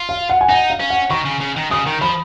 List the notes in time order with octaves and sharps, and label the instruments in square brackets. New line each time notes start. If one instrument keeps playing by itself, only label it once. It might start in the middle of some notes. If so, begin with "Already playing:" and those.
Already playing: [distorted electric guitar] F4
[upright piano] F5
F#5
G#5
[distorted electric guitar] D#4 [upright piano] F#5
[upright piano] F5
[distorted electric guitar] C#4
[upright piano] F#5
[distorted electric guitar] D#3 [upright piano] C#6
[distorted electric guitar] C#3
C#3
D#3
[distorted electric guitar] C#3 [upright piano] D#6
[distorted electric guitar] D#3
[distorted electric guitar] F3 [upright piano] B5